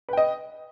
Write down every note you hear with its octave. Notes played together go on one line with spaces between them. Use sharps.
B4 D#5 G5